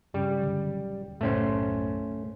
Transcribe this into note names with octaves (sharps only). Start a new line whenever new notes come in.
G2 C#3 G3
D#1 D3 F#3
F#1 B1 A2 A3 C#4 C5